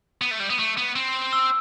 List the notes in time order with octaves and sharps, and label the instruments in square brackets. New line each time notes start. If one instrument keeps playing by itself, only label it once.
[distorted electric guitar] B3
A3
G3
B3
A3
B3
C4
[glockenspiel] E6